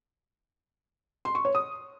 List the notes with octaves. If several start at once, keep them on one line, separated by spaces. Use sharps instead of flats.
C6
C#6
C#5
D#6